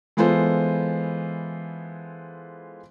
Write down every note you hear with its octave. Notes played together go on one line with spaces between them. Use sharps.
E3 G#3 B3 F4 A4 C5